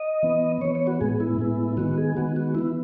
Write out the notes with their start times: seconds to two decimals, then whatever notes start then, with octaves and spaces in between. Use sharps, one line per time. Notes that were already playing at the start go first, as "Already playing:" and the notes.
Already playing: D#5
0.23 E3 B3
0.61 E3 B3 C#5
0.75 C#5
0.87 F#4
1.01 A2 G#3 B3 G#4
1.20 E4
1.39 A2 G#3 B3
1.77 D#3 G#3 B3 F#4
1.98 G#4
2.16 D#3 G#3 B3 F#4
2.36 F#4
2.55 E3 B3 E4